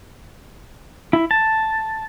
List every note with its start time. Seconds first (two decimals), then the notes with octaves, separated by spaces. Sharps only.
1.13 E4
1.31 A5